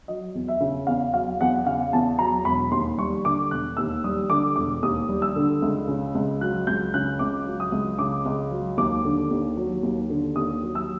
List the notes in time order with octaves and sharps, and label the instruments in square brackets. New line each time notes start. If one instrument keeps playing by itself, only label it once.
[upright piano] F#3 D#5
E2
E5
C#3
E2 F5
F#3 F5
E2 F#5
C#3 F5
E2 A5
F#3 A#5
E1 B5
D#2 C6
G3 C#6
D3 D6
E1 F#6
D#2 E6
G3 D#6
D3 D6
E1 D6
D#2 D#6
G3
E6
D3
C#2
C#3
C#2
F#3 F#6
C#2 G6
C#3 F#6
C#2 D6
F#3
D#6
C#2
C#3 D6
C#2
F#3
D#2 D6
D3
D#2
F#3
D#2
D3
D#2 D#6
F#3
E6